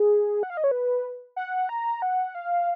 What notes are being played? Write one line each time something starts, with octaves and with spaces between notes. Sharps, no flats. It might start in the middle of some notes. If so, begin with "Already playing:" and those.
Already playing: G#4
F#5
F5
D#5
C#5
B4
F#5
A#5
F#5
F5